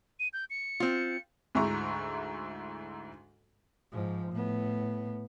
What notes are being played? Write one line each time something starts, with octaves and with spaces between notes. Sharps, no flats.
D#7
G6
C#7
C4 F4
D2 G#2 E4 A#5 C#6
G#2 F3
A2 B3